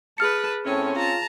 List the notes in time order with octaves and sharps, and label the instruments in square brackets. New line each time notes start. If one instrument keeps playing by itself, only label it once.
[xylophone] G#4 F6 C#7 [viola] B4 A5
[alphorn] A2 [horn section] C4 C#4 [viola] C#5
[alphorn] F4 [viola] A5 A#5